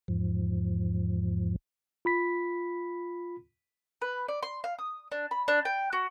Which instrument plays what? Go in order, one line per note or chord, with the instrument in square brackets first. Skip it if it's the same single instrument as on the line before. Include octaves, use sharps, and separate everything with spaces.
[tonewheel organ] E2 G#2 F3
[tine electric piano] F4 B5 B6
[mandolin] B4
D5
C6
F5
D#6
D4
B5
D4
G5
F#4